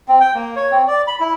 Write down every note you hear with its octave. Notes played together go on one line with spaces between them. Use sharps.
C4
G5
A#3
C#5
C4
D5
B5
E4